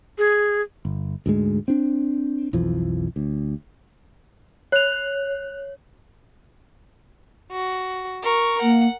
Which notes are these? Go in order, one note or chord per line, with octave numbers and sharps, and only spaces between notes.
G#4
G1
D2 G#2 G#3
C4 D4
B1 F2 E3 F3
D2
C#5 F#6 F7
F#4
A#4 C#6
A#3 F#5